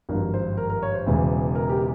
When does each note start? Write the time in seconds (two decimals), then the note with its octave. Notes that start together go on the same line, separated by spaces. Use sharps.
0.09 G#1 G2 F3 A#4
0.34 C5
0.57 A#4
0.70 A#4
0.82 C#5
0.94 C5
1.06 E1 E2 C#3 E3
1.55 A#4
1.69 G4